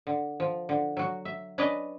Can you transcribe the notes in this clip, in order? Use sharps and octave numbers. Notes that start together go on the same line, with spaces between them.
D3
F3
D3
F#3 F#4
E5
C#4 D4 B4 D5 D#5 A#5